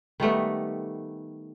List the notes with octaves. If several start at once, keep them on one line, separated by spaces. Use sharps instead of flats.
D#3 G3 A3 B3